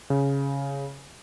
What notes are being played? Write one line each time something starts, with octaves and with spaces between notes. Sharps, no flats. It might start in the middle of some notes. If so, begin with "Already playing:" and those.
C#3